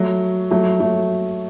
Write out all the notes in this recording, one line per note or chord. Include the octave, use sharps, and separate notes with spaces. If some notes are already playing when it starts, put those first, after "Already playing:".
Already playing: F#3 A3
F#3 A3
F#3 A3